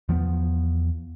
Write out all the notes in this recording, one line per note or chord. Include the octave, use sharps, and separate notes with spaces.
E2 F3 G3 B3